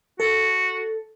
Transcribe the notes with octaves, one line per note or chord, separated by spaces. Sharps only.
F#4 A4